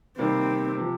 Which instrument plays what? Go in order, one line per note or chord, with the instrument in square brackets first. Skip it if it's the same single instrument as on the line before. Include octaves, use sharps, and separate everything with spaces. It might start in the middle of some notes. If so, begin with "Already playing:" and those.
[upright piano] C3 D#3 G3 A#3 [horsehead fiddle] C4
[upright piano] C3 F3